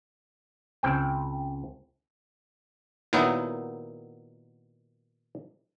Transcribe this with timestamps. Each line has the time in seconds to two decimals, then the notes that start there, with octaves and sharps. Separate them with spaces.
0.83 C#2 C4 G5
3.13 A#2 D#3 F#3 B3 D#4 E4